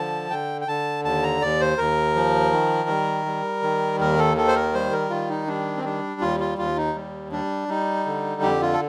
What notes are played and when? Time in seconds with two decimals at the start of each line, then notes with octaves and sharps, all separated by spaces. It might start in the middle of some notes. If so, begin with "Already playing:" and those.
Already playing: D3 F3 A5
0.30 D3 G5
0.61 G5
0.68 D3 A5
1.04 D#2 A5
1.23 A#5
1.42 D#2 D5
1.60 C5
1.78 D#2 A#4
2.15 F3
2.52 D#3
2.89 G3
3.26 G3
3.62 D#3
3.99 D#2 A#4
4.18 A4
4.36 D#3 A4
4.48 C5
4.55 A#4
4.74 G3 C5
4.93 A#4
5.10 D#3 F4
5.30 D#4
5.47 G3 D4
5.77 C4
5.84 G3 D4
6.21 D#2 F4
6.40 F4
6.58 D#2 F4
6.77 D#4
6.96 G3
7.31 G3 D4
7.68 G3 D#4
8.06 D3
8.42 F2 G4
8.61 F4
8.73 A4